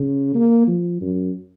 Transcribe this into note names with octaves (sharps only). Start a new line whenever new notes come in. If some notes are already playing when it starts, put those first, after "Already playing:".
Already playing: C#3
A#3
F3
F#2